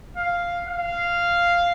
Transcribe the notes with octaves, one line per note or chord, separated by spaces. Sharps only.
F5
F5